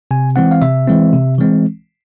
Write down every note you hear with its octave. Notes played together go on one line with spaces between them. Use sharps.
C3 G#5
E3 G#3 C4 F#5
F5
C3 E5
E3 G#3 C4
C3
E3 G#3 C4